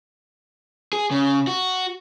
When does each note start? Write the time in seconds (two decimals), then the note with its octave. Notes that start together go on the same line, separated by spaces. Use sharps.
0.93 G#4
1.11 C#3
1.47 F#4